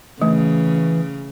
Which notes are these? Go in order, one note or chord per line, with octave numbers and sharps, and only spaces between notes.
C#3 E3 A3